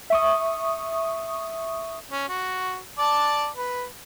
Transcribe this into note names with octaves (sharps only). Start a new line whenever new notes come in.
E5 C#6 D#6
C#4
F#4
D5 A5
B4